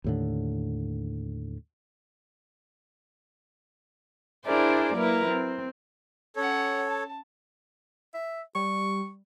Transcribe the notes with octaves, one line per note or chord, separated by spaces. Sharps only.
D#2 A2 D3
D4 E4 G#4 A#4 C5 D5
F#3 A#3 E4 A#4 B4
C4
C#4 A4 C#5 F#5
A5
E5
G3 C#6